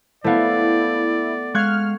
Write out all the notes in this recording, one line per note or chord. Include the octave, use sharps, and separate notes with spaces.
A3 B3 E4 C5 D5 F5
G#3 F5 C#6 F6 F#6 G#6